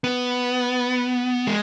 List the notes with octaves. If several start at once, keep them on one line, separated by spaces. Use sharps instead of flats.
B3
G#3